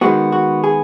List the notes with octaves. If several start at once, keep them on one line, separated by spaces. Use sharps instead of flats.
D#3 G#3 B3 F#4
F#4
G#4